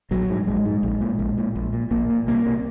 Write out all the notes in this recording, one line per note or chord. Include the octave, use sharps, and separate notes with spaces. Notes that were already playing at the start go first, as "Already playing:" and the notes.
A#1 F#3
G#2
A#1 G#3
G#2
A#1
A#2
A#1
A#2
A#1
A#2
A#1 A#3
A#2
C2 A#3
C3